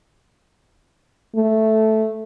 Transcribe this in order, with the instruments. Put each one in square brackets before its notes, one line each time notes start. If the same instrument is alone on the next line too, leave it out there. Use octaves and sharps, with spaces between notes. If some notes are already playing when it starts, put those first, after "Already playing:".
[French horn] A3